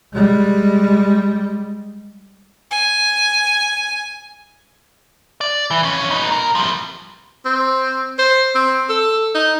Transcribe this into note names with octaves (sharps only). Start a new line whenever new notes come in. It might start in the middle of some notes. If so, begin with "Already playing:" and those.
G3 G#3
G#5
D5
E3
F2 C#4
B3 D#4
B1 A#4
F3 G3
C4
C5
C4
A4
D#4